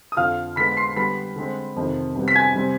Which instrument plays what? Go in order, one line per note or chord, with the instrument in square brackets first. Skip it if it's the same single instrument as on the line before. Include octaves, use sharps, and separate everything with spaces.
[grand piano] D#6
F2 D3 F3 F5 F6
D3 G#3 B3 B5 B6
C6 C7
D3 G3 B3 B5 B6
D3 G#3 C4
F2 C3 D#3
C3 G3 B3
B6
G#5 G#6
C3 G3 C4